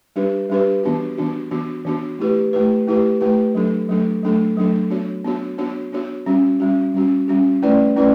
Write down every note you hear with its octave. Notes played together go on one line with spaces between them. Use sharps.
G3 D4 G4 B4
G3 D4 G4 B4
E3 B3 D4 F#4
E3 B3 D4 F#4
E3 B3 D4 F#4
E3 B3 D4 F#4
A3 E4 G4 B4
A3 E4 G4 B4
A3 E4 G4 B4
A3 E4 G4 B4
F#3 A3 D4 A4
F#3 A3 D4 A4
F#3 A3 D4 A4
F#3 A3 D4 A4
B3 D4 F#4 C#5
B3 D4 F#4 C#5
B3 D4 F#4 C#5
B3 D4 F#4 C#5
G3 C#4 F#4
G3 C#4 F#4
G3 C#4 F#4
G3 C#4 F#4
A3 C#4 E4 B4 D5
A3 C#4 E4 B4 D5